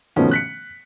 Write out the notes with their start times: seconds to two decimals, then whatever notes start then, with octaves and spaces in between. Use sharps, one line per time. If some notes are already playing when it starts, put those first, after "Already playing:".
0.16 B2 D#3 F3 A3 B3 C#4
0.31 F#6 B6 C#7